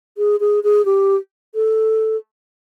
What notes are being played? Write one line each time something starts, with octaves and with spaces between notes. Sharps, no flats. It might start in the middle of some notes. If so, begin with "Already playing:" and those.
G#4
G#4
G#4
G4
A4